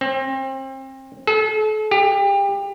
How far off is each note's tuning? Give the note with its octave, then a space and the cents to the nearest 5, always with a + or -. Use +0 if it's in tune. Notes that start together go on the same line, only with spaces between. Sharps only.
C4 +30
A4 -40
G4 +30